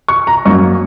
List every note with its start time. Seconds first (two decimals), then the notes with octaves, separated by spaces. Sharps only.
0.08 C#6
0.27 A#5
0.45 F#2 F#3 A#3 C#6